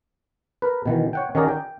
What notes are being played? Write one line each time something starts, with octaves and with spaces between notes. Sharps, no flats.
A#4 B4
B2 D#3 E3
C#5 F#5 G5
D#3 C#4 F#4 G#4 A#4 D5
G5